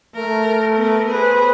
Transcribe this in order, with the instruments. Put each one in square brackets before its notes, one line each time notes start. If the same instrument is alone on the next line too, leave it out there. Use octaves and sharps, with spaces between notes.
[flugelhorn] A3 [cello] A#4
[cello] B3 A#4
[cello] G#4 C5 [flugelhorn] B4